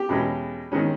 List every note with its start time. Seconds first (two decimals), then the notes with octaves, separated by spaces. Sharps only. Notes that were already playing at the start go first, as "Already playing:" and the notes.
Already playing: G4
0.09 E2 B2 G#3 C#4
0.72 D#3 G#3 C#4